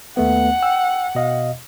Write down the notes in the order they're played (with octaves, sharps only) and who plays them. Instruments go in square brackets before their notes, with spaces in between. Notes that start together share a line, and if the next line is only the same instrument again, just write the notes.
[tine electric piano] D#2 A3 B3 [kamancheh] F#5
[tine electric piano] G5 E6
B2 D#5 F5